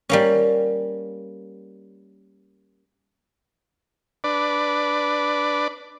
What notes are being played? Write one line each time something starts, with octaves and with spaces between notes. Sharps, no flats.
G3 A#3 C#4
D4 B4 D5